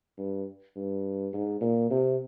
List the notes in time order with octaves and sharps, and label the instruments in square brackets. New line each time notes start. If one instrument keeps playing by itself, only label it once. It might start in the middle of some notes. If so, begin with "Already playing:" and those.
[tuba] G2
G2
G#2
A#2
C3